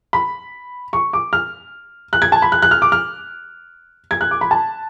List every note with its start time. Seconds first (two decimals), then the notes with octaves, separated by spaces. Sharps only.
0.13 B5
0.93 C#6
1.13 D6
1.33 F6
2.13 F#6
2.22 G#6
2.32 A5
2.42 B5
2.52 F#6
2.62 F#6
2.71 F6
2.82 D6
2.92 F6
4.11 G#6
4.21 F#6
4.31 D6
4.41 B5
4.51 A5